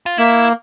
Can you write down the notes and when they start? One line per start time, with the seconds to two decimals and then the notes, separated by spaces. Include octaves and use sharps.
0.06 F4
0.18 A#3 E4